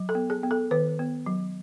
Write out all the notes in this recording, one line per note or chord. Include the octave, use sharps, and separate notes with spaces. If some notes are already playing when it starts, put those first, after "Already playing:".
Already playing: F#3
A4
B3
G#4
B3
A4
D#3 B4
B3
F#3